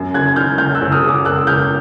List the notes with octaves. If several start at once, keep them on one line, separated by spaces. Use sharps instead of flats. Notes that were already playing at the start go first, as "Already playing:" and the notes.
Already playing: F#2
F#1 F#6 G#6
D#3 F6 G6
F#1 F6 G6
E6 F#6
F#1
D#6 F6
F#1
D6 E6
F#1 E6 F#6
F#1 F6 G6